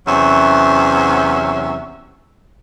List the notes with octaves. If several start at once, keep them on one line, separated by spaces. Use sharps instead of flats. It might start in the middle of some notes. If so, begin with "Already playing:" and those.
E2 C3 F#3 C#4 E5